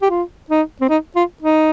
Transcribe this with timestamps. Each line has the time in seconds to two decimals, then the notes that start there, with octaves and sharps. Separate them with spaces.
0.02 G4
0.10 F4
0.50 D#4
0.81 C4
0.89 D#4
1.16 F4
1.42 D#4